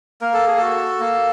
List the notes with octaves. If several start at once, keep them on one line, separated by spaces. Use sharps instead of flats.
A#3 A#4
A4
G#4
F#4 A4
A#3